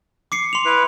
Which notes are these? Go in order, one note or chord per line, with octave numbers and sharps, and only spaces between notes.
D6 C7 C#7
C6 F7
E4 B4